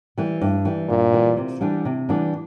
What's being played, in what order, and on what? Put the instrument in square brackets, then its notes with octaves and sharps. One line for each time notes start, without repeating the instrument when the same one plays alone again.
[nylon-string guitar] E3 G3
G2
E3 G3
[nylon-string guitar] G2 [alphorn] A#2
[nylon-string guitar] E3 G3
C3
E3 G3 B3 D4
C3
E3 G3 B3 D4